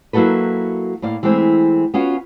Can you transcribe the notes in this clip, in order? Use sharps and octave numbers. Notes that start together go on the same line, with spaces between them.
F#3 A#3 E4 F#4 A4 B4
A2 A#3 D5 F5
E3 G#3 A3 C4 E4
B3 C#4 F4 F#4